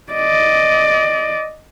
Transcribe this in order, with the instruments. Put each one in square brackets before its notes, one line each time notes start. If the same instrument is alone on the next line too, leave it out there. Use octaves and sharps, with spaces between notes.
[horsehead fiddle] D5 D#5